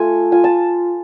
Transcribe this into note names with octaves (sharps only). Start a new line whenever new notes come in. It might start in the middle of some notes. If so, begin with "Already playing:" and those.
Already playing: A3 F4 G#5
F4 G#5
A5